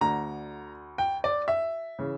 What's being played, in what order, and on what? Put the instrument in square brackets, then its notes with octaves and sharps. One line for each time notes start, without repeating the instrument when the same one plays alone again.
[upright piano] D2 D3 A#5
G5
D5
E5
C#3 E3